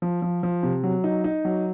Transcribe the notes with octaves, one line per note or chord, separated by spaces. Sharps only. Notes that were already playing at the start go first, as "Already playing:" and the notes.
F3
F3
F3
C3
F#3
D#4
D#4
F#3